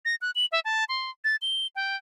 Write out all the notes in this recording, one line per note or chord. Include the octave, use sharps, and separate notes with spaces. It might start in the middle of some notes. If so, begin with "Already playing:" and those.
A#6
F#6
F#7
E5
A5
C6
A6
G7
G5